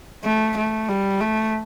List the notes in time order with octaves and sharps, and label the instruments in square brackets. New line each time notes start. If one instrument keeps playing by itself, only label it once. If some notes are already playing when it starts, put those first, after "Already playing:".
[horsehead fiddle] A3
A3
G3
A3